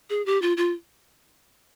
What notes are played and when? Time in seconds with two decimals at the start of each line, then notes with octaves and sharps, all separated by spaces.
0.10 G#4
0.26 G4
0.42 F4
0.57 F4